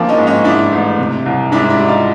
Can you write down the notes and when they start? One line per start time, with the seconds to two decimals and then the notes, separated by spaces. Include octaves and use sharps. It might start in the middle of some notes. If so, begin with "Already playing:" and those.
Already playing: F3 A#3 C4 D4
0.09 C#4 D#4
0.18 G#2
0.27 C#4 D#4
0.44 G#2 D4 E4
0.72 A1
0.99 C3
1.26 C2
1.52 G#2 D4 E4
1.69 D4 E4
1.79 G3
1.88 D#4 F4